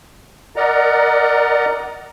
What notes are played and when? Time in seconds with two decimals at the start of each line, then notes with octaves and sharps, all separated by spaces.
0.56 A#4 D5 D#5 F#5 A#5